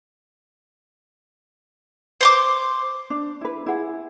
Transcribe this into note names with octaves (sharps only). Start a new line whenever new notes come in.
C5 C6 D6
D4
E4 B4
E4 F4 G#4 F#5